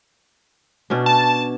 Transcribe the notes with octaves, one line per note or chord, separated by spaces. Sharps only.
B2 C#4 D4
A5